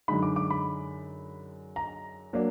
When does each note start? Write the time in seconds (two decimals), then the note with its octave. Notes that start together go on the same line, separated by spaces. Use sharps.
0.08 F#2 D3 G#3 D#4 B5
0.23 D6
0.36 D6
0.50 B5
1.76 A#5
2.33 F#3 A#3 D4